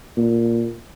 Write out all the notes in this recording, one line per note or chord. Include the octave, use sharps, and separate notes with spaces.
A#2